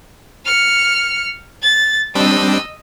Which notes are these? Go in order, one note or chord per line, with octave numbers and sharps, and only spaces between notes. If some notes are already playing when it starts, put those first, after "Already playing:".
F6 C#7
A6
G3 C4 D4 D#5 E6